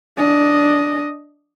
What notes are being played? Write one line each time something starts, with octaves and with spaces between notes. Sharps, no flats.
D4 D#5